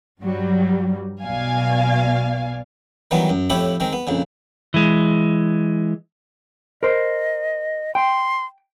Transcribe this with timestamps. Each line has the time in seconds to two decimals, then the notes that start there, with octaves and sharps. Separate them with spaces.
0.22 G2 F#3 G3
1.25 B1 B2 D5 F5 G#5
3.11 D#3 E3 F#3 G3 B3
3.29 F#2
3.50 F2 A2 E4 G4 C#5 B5
3.80 D#3 G#3 C4
3.93 B3
4.07 A#1 F2 C#3
4.74 E3 G#3
6.83 A#4 C5 D#5
7.95 G5 C6